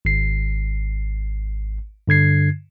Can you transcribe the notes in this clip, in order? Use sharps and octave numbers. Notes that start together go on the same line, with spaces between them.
G#1 C7
G2 D3 G#6 C7